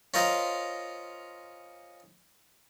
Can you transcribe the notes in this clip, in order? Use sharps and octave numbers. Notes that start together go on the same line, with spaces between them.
C#4 F4 A#4 C5 D#5 F5